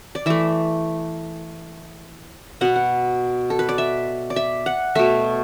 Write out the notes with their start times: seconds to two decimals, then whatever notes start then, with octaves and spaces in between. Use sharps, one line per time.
0.15 D5
0.26 E3 A3 E5
2.61 B2 B3 F#5
2.76 F#5
3.50 A4
3.59 B4
3.69 D5
3.78 E5
4.30 D5
4.36 E5
4.66 F#5
4.95 B2 A3 E5